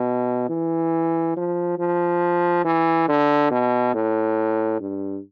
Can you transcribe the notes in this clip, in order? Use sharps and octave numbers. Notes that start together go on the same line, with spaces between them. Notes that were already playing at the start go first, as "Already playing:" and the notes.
Already playing: B2
E3
F3
F3
E3
D3
B2
A2
G2